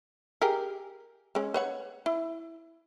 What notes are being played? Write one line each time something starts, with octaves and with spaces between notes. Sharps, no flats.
G4 G#4 A#4
G#3 C#4
B4 C#5 F#5
E4